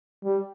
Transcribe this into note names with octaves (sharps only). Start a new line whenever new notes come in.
G3